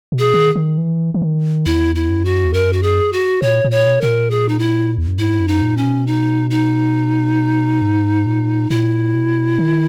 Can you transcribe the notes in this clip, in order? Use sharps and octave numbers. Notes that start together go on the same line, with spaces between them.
B2
G#4
D#3
D#3
E3
E3
D#3
E2 E4
E4
F#2
F#4
E2
F#2 A#4
F#4
G#4
F#4
A#2 C#5
A#2
C#5
B2
B2 A#4
A#2
G#4
D#4
E4
E2
F#2
G#2 E4
F#2
D#4
A#2
C#4
B2
D#4
D#4
G#2
A#2
A#2 E4
B2
D#3